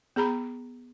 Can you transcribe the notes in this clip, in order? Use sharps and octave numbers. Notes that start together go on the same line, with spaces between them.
B3 G#4 A#5 B5